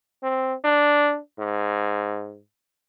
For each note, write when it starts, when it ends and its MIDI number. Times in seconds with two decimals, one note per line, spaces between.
0.23 0.54 60
0.64 1.19 62
1.39 2.40 44